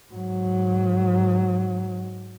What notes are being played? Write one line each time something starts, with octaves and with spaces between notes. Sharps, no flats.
G#2 F#3